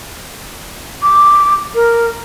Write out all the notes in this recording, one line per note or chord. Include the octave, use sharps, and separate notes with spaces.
D6
A#4